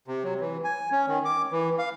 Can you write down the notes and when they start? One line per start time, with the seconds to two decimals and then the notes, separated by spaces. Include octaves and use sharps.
0.08 C3
0.24 F#3
0.40 E3
0.64 G#5
0.92 C#4
1.08 D#3
1.25 D6
1.51 E3
1.78 F5